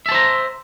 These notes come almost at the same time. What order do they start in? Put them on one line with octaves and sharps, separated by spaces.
E5 A5 C5 A#5